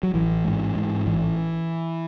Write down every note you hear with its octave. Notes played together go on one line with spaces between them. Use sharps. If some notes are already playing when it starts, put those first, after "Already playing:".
F#3
A1 E3
G#2
G#2
A1 E3